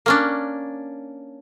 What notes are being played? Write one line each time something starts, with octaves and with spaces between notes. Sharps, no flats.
A#3 C#4 D4